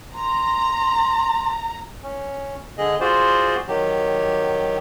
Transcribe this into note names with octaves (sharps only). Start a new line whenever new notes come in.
A#5 C6
C#4
D3 G#4 D#5
F4 F#4 G#4 C5 D5
D#3 F#3 G4